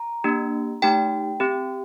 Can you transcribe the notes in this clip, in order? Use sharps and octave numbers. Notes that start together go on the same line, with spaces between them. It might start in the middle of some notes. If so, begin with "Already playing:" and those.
Already playing: A#5
A#3 D4 G4
A3 D#4 G4 G5
C4 G4